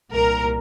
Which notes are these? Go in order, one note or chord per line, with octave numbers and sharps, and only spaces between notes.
C2 A#2 A#4